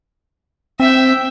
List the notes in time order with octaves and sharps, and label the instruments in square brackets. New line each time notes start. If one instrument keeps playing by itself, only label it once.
[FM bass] C4 [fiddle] E5 G5